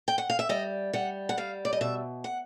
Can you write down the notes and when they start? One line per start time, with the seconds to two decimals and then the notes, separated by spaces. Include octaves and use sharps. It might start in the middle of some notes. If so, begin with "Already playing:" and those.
0.08 G5
0.18 F#5
0.30 F5
0.39 E5
0.49 G3 D#5
0.93 G3 F#5
1.29 F#5
1.37 G3 F5
1.65 D5
1.73 D#5
1.81 B2 E5
2.24 F#5